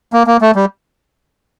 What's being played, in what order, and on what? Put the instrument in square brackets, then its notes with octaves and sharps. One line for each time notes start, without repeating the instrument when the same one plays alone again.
[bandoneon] A#3
A#3
A3
G3